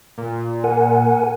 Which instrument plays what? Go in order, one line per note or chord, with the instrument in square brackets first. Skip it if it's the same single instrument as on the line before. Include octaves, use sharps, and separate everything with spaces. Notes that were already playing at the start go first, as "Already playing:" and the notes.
[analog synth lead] A#2
[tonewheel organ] A#4 F#5 G#5